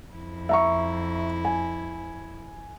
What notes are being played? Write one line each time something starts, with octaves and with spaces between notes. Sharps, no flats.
F2 E4
E5 A#5 C#6
G#5